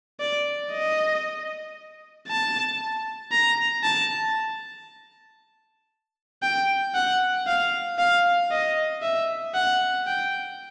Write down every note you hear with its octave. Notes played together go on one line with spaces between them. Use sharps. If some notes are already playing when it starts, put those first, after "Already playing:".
D5
D#5
A5
A#5
A5
G5
F#5
F5
F5
D#5
E5
F#5
G5